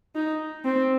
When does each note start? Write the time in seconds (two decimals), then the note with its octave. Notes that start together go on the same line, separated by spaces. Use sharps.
0.15 D#4
0.65 C4